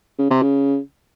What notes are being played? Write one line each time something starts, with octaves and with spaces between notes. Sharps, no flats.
C#3
C3
C#3